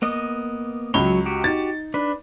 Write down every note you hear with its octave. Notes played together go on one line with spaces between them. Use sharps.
A#3 B3 D#5
C#2 F#3 C#5 B5 G7
F#4 G4
D#4 A6
D4 B4